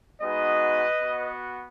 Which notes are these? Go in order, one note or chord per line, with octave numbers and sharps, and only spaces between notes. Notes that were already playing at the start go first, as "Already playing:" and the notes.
G#3 B3 D#4 F#4 B4 D#5
B3 F#4